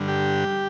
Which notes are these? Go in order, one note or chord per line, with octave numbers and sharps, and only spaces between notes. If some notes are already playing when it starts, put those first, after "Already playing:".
Already playing: G2 D3
G4